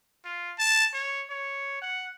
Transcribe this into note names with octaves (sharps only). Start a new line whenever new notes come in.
F4
A5
C#5
C#5
F#5